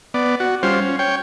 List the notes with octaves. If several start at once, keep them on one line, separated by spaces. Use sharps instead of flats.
B3 D5
F#4
G3 C#4 F4 C5
C#4
C#5 G5